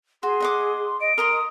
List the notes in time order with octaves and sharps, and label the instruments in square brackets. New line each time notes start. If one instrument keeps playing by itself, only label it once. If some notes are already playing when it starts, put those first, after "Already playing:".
[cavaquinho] F#4 [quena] G#4 [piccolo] C6
[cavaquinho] D#5 F#5 D6
[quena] D#5 [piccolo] D7
[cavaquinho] A#4 A#5 C6 [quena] D#6